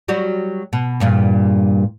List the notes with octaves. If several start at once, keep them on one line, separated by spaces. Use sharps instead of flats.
F#3 G3 F#4
B2
E2 G2 A#2